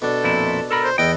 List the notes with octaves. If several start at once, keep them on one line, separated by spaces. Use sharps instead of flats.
B2 D4 A4
F2 A#2 E4
A4 A#4 B5
C5
E2 B3 A4 D#5 G5